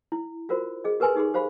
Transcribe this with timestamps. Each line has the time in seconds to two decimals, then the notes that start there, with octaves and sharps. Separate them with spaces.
0.12 E4
0.49 F4 F#4 A#4 C5
0.84 G#4 D#5
1.00 G4 A#4 B4 G#5 C6
1.15 D#4 G4 G#4 C6
1.34 G4 C5 F5 B5